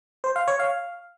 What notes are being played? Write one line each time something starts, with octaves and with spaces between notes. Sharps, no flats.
C5
F5
C#5
F5